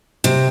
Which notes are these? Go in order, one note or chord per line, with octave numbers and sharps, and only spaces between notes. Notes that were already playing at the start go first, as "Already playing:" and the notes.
C3